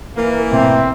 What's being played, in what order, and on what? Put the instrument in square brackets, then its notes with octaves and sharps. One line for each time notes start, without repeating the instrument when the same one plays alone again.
[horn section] E3 A#3 [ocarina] A#4
[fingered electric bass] G#2 B2 A3 [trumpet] C4 [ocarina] E5